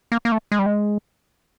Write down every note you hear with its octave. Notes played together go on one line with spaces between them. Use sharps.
A#3
A#3
A3
G#3
G3
G#3